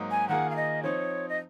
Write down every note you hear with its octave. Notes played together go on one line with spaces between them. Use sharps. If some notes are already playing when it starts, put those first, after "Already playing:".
Already playing: G#2 F#3 A#3 D#4
G#5
D#3 A#3 F4 G#4 F#5
F5
D#5
F3 C4 D#4 C#5
D#5